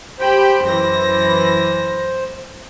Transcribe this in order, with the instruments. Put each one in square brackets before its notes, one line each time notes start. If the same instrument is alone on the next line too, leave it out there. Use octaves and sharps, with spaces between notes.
[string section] G4 G5 B5 [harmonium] C5
[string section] F#2 E3 A#6